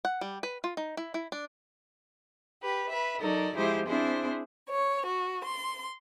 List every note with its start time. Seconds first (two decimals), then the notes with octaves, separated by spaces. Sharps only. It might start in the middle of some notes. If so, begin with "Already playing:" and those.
0.05 F#5
0.21 G3
0.43 B4
0.64 F4
0.77 D#4
0.97 E4
1.14 E4
1.32 D4
2.61 G4 B4
2.90 B4 E5
3.19 F#3 D#4 A4 A#4 D5
3.55 F3 G#3 E4 G4 G#4 C5
3.86 C4 D4 E4 G#4 C5
4.69 C#5
5.05 F#4
5.44 C6